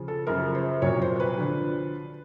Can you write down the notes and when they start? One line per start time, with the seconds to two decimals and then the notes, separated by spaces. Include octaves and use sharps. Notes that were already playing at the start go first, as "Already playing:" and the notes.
Already playing: C#3 F3
0.08 A4
0.27 F#2 C#3 F3 A#4
0.55 C5
0.82 C2 A#2 F#3 C#5
1.02 C5
1.20 B4
1.38 D3 F3